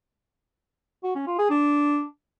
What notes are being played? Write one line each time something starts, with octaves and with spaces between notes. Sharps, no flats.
F#4
C#4
F4
G#4
D4